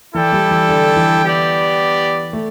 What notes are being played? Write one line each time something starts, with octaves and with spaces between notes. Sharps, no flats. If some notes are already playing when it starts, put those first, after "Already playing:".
E3 E4 A4 D5 G5
G3
E3
D3
E3
B3 G4 D5
A3